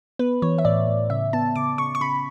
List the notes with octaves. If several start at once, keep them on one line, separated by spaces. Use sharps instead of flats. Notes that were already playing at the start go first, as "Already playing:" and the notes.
B3 B4
E3 C#5
E5
A2 D5
A2
C#3 E5
B3 A5
C#3 D6
C#3 C#6
C#6
C#3 B5